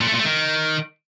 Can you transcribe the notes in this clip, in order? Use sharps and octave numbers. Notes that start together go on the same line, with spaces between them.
A#2
A3
A#2
A3
D#3